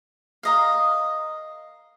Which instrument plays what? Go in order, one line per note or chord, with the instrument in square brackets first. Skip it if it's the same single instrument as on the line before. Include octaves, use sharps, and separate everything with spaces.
[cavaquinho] A#4 D#5 F5